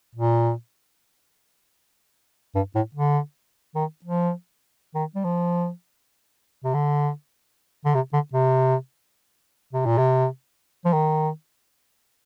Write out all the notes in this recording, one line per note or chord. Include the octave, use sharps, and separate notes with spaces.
A#2
G2
A2
D3
D#3
F3
D#3
G3
F3
C3
D3
D3
C3
D3
C3
C3
A#2
C3
F3
D#3